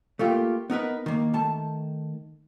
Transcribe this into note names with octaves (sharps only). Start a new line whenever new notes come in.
A3 A#3 F4 G4
B3 D#4 A#4 B4
D#3 A#3
D#3 A3 A5